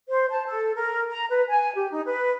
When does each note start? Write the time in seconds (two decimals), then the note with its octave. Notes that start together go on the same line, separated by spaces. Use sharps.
0.08 C5
0.30 A5
0.46 A4
0.75 A#4
1.10 A#5
1.29 B4
1.48 G#5
1.75 G4
1.90 D#4
2.05 B4